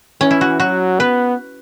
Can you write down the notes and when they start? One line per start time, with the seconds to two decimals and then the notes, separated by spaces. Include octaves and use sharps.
0.21 E3 C#4
0.31 E4
0.41 F#4
0.60 F#3 F#4
1.00 B3 B4